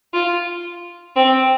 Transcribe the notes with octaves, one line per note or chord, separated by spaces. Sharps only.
F4
C4